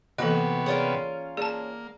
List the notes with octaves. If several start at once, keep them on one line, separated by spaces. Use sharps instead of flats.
C3 E3 A#3 B3 D#4 F#4 A4 D#5
C#4 F4 G#4 A#4 C#5 D5
A#3 G#4 D5 A5